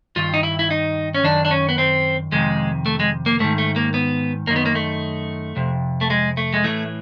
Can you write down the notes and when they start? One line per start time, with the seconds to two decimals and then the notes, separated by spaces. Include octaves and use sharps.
0.16 G2 D#3 F4
0.34 D#4
0.43 E4
0.59 E4
0.70 D#4
1.14 C#4
1.24 F#2 D#3 D4
1.45 D4
1.51 C#4
1.69 B3
1.78 C4
2.32 F2 C3 D#3 G#3
2.86 A3
3.00 G#3
3.26 A#3
3.40 G#2 D#3 A3
3.58 A3
3.76 A#3
3.94 B3
4.47 F#2 A#3
4.51 D#3
4.56 B3
4.66 A#3
4.75 A3
5.56 F2 C3
6.01 A3
6.10 G#3
6.37 A3
6.54 G#3
6.64 A2 E3 A3